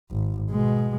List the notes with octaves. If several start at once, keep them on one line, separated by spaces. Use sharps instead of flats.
G#1
B2 G#3